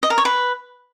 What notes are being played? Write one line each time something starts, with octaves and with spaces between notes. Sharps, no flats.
D#5
A#4
C#5
B4